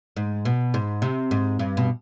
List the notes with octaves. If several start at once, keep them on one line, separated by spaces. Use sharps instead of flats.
G#2
B2
G#2
C3
G#2
G2
B2